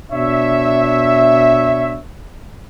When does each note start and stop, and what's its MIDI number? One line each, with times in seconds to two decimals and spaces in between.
0.12 1.99 47
0.12 1.99 62
0.12 1.99 73
0.12 1.99 76